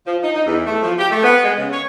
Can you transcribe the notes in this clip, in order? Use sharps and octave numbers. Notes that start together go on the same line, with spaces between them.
F3
D#4
D#4
E2
A3
F3
G4
A3
B3
G#3
C#3
C#5